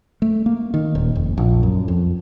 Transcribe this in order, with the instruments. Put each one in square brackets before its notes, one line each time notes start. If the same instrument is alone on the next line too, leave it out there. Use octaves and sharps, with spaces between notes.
[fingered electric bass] A3
A#3
D#3
D#1
F1
A#1
F#2
F2